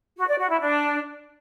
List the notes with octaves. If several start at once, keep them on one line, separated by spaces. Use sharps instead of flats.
F#4
D5
F#4
E4
D4